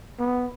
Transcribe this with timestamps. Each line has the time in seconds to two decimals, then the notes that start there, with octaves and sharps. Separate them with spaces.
0.19 B3